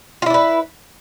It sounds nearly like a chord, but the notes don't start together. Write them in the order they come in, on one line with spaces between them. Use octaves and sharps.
F4 E4 D4 B4